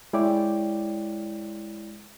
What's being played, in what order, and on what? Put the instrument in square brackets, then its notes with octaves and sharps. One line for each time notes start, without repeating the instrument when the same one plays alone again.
[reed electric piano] G#3 E4 C#5 D5 G5 D6